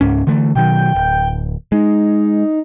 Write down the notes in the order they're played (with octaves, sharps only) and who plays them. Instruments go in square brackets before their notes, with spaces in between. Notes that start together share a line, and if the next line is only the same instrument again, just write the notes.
[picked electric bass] C#2 G#2 C#4
D3 E3 A3
[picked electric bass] B2 D#3 F#3 [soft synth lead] G5
[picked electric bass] D1
[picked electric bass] G#3 [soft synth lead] D#4